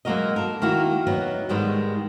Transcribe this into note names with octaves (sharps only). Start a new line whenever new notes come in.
F#3 G#3 A#3 F#4 A#4 D#5
A4 A#4
D#3 A#3 E4 F#4
F#3 B3 D#4
G#2 D#3 G3 G#3 B3